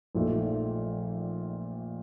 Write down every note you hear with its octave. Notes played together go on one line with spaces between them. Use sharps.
A#1 A#2 A3 D#4